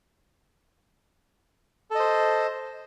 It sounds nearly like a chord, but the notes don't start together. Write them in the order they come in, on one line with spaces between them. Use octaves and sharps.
A4 D#5 C5